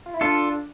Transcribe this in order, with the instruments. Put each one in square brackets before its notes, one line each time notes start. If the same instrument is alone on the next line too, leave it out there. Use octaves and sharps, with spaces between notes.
[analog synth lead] F4
E4
[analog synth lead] D4 [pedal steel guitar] F4 A4